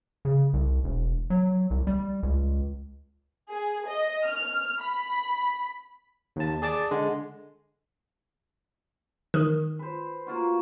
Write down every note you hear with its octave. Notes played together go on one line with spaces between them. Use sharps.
C#3
C2
E1
F#3
C2
G3
C#2
G#4
D#5
F6
B5
D#2 A5
G#4 D5 A5 D6
D3 G#3
D#3
B4 C5
A#3 F4 F#4